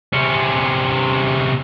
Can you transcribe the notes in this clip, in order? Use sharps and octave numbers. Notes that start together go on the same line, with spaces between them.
C3 C#4